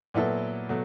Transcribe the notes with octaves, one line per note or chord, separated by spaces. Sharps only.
A#2 F#3 B3 E4 A4
B2 F#3 A3